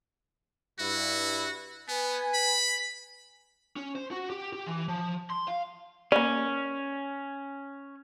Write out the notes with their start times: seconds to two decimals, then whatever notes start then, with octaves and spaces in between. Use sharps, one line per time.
0.79 G2 E4 F#4
1.88 B3 B4 G#5
2.34 B5
3.76 C#4
3.95 C5
4.11 F#4
4.30 G4
4.53 G4
4.66 E3
4.88 F3
5.30 C6
5.48 F5
6.12 A#3 C#4 D5